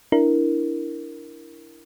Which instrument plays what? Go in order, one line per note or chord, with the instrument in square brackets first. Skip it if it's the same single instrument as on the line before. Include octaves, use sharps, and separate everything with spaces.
[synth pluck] D4 E4 A#4